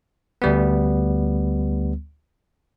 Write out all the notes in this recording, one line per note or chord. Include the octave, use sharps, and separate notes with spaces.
D2 G3 B3